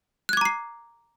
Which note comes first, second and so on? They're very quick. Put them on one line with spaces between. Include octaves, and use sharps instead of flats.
F#6 G#6 D6 A#5 C7